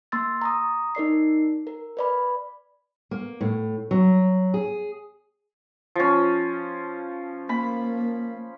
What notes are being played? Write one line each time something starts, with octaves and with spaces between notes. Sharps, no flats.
A#3 C6 E6 A6
A#5 C#6 D#6
D#4 A#4 D5 C7
A#4
B4 D5 B5
A#3
A2
F#3
G#4
F3 C#4
A#3 B5